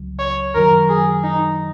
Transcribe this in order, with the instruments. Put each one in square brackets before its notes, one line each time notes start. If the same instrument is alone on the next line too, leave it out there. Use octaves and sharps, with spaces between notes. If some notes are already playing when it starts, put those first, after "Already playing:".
Already playing: [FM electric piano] C#2 C#3 F#3
[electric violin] C#5
[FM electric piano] F#2 D#3 F#3 [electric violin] A#4
[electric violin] G#4
D#4